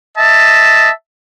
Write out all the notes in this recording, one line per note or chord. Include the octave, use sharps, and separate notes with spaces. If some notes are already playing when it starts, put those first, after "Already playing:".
D#5 E5 A5